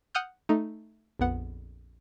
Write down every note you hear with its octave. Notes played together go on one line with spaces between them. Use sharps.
F#5 D#6 F6 G6
A3 D#4
A#1 F2 B3 F#5